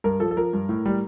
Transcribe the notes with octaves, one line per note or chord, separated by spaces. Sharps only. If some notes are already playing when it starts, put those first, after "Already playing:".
G2 A#4
F3 A4
A4
F3 A#4
G2
A2
G3